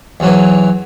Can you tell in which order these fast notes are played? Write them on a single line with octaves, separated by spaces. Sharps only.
E2 F#3 E3